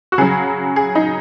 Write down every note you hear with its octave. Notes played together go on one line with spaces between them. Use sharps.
F#4
C#3 F#3 G#4
G#4
D#4